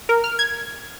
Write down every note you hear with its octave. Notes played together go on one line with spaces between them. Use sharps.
A#4
F6
G#6